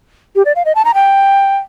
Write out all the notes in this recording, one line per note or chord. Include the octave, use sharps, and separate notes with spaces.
G4
D5
F5
D#5
A5
A#5
G5